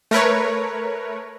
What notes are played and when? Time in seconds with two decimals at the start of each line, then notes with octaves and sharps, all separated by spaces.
0.11 A3 A#4 B4 C#5